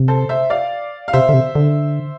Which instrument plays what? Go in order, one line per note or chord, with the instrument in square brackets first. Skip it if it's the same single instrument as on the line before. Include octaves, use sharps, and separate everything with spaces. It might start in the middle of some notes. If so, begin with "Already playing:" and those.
Already playing: [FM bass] C3
[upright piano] A4 C5
C5 E5
D5 F5
F5
[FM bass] C3 [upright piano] C5 E5
[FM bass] D3
C3
D3